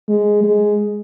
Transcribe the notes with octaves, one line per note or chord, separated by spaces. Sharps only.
G#3
G#3